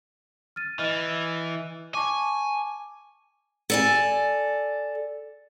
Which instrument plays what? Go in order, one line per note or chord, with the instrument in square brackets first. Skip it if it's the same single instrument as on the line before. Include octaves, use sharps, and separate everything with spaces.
[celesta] F6 A6 D#7
[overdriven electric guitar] E3 [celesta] D#5 F6 A6
[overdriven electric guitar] G#5 [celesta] A5 C#6 D6
[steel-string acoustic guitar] A4 D5 G#5